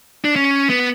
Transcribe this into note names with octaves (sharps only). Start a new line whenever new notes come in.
D4
C#4
B3